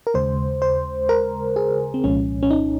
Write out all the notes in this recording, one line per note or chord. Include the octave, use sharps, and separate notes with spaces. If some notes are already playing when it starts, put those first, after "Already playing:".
A#4
D#2 C#3 G#3 C5
C5
A#4
G#4
C4
C2 A#2 F3 G#3 C#4
C#4
D#4